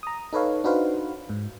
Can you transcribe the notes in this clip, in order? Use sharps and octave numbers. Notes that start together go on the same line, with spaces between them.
A#5 D#6
D#4 A4 B4 C#5 F5
D4 D#4 F#4 B4 C5 F5
G#2